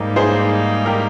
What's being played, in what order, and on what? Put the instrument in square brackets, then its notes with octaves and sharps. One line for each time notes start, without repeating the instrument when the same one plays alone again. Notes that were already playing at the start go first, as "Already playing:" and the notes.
Already playing: [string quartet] G#2 G3 A#3 D#4 [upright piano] G4
[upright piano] G#4 C5
G4 A#4